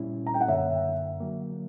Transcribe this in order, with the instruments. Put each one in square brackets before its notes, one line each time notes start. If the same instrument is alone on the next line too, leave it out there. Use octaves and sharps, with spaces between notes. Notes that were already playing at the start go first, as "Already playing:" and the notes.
Already playing: [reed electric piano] A#2 G3 C#4 E4
[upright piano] A#5
G5
F#5
[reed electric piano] F#2 D3 A#3 [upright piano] C#5 E5
[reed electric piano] D3 F#3 A#3